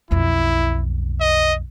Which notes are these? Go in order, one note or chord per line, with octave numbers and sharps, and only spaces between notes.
B1 F2 E4
D#5